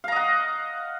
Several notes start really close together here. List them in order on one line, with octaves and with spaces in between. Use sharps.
F5 A#5 D#5 F#5